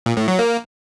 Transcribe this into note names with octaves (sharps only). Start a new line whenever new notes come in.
A#2
A2
F#3
A#3